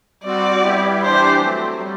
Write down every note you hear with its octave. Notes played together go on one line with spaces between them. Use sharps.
G3 C4 F#4 D5
G3 B3 E4 G4
E3 G3 D4 G4 C5
F#3 A3 C4
G3